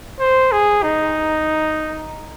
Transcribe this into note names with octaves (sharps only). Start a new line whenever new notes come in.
C5
G#4
D#4